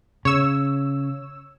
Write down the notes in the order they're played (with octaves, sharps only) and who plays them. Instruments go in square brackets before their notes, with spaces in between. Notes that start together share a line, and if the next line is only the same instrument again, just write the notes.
[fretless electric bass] C#3 [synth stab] C#5 E6